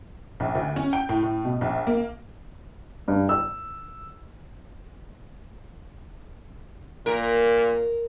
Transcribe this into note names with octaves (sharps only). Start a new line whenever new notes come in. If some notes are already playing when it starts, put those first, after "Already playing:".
A#1
D2
C#4
G5
A2
A2
B2
A#1
A#3
G2
E6
A#2 A#4